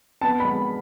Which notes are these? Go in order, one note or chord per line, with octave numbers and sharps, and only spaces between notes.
B3 A5
B5
G#3